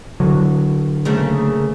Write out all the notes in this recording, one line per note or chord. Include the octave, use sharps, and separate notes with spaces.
D3 F#3
C#3 A3 A#3